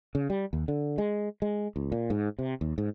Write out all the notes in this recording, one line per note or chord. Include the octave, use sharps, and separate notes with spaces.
C#3
G3
D#2
D3
G#3
G#3
C#2
A#2
G#2
C3
D#2
G#2